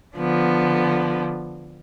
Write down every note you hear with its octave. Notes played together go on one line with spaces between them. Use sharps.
D3 F3 B3